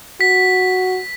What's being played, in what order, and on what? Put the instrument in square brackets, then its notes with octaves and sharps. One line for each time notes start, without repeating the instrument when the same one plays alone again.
[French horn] F#4 [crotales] B6